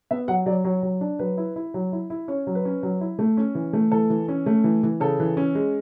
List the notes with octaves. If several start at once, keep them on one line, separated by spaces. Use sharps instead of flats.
B3 E5
F#3 F#5
F#3 D5
F#3 C#5
F#3
D4
F#3 B4
E4
E4
F#3
E4
E4
C#4 C#5
F#3
B4
C#4
F#3
E4
A3
C#4
E3
A3
E3 A4
E3
C#4
A3
E3
E3
C#3 A4
E3
C#4
G#3